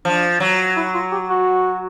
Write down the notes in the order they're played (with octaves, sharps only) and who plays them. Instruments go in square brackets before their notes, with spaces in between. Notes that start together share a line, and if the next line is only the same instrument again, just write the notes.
[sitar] F3 [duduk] D4
[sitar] F#3
[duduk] E4
F4
G4
F#4